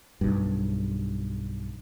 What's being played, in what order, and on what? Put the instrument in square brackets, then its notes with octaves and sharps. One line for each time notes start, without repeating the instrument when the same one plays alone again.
[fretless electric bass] B1 G2